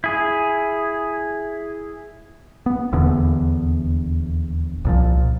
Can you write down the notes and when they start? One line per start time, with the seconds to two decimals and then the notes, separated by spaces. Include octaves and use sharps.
0.04 E4 G#4
2.66 B3
2.92 D#1 E2 D3 B3
4.85 C2 A#2 F3